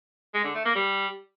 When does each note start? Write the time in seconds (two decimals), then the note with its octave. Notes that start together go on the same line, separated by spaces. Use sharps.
0.34 G#3
0.44 D3
0.55 A3
0.65 A#3
0.75 G3